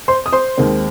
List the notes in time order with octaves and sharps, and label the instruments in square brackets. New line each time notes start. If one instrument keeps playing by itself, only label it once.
[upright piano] C5 C6
D#6
C5 C6
D#2 D#3 G#3 C4